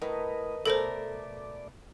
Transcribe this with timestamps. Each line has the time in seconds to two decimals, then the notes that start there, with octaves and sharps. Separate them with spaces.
0.02 A2 A#4 B4 D#5
0.66 B2 A3 A4 A#4 C5 D5